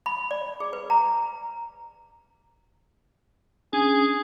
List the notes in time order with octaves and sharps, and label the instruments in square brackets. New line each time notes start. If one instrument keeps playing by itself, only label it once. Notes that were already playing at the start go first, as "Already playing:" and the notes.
[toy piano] B5
D5
G#4
B4
A#5
[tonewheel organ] C#4 D4 [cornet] G#4